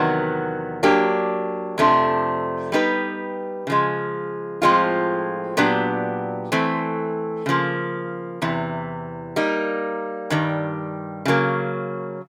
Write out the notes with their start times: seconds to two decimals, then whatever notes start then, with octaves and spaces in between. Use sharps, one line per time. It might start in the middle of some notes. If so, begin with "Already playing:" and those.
Already playing: E2 C3 D#3 F#3 B3
0.83 F#3 A#3 D4 G4
1.78 F2 C3 F3 A3 D4
2.72 G3 B3 D#4 G4 B4
3.67 C#3 F3 G#3
4.62 A2 F3 G#3 C4 F4
5.57 A#2 F#3 B3 D4 G4
6.52 E3 A3 C4
7.46 C#3 F3 A#3
8.42 E2 C3 E3
9.36 G3 A#3 D#4
10.30 G2 D#3 G3
11.25 C#3 F#3 A#3